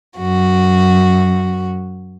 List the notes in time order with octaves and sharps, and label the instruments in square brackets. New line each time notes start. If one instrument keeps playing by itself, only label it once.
[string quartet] F#2 F#4